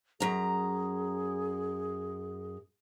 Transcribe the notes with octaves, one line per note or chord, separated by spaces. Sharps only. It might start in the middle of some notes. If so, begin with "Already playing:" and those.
F#2 G#4 A#5